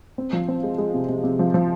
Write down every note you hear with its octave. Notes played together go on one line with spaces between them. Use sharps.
C4
F3
C4
G#3
G#3
C3
C3
C3
F3
F3